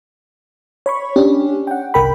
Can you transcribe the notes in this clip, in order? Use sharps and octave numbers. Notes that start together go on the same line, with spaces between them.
C#5 B5 C#6
C#4 D4 G4
F#5 G5
G1 C2 A#4 G5 B5